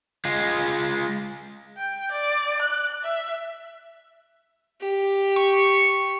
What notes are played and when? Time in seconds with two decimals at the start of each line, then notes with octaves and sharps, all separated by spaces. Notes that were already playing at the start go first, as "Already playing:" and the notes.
0.25 G#3 F4
1.78 G5
2.12 D5
2.62 F#6
3.04 E5
4.81 G4
5.36 C#6